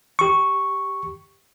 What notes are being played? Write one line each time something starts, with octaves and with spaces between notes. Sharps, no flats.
G4 C#6